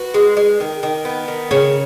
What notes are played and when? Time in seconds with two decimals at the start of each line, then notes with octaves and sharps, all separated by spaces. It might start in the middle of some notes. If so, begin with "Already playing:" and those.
Already playing: F#4 B4
0.14 G#3
0.37 G#3
0.60 D#3
0.83 D#3
1.05 B3
1.28 D#3
1.51 C#3 C#5